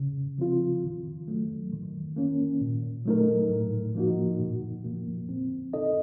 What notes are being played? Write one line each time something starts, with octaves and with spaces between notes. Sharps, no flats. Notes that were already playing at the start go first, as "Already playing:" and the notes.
Already playing: C#3
F3 C4 F4
D#3
F#3 A3
D#3
A#3 C#4
A#2
F#3 A3 D#4 A#4
A2
F3 A#3 D#4 F#4
A#2
F3 A#3
C4
D#4 A4 D#5